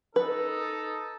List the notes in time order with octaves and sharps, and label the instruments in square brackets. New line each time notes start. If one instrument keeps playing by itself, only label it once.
[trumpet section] D#4 A4 [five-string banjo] B4